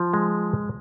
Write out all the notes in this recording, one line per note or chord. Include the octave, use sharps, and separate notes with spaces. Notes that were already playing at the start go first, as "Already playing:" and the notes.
Already playing: F3
G#3